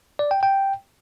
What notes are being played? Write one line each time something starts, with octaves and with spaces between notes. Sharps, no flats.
D5
G5
G5